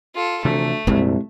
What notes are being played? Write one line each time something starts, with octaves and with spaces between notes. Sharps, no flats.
F4 A4
D2 C3 E3 F3 A3
C2 F2 A#2 G#3